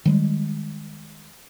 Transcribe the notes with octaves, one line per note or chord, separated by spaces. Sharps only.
D#3 G3 G#3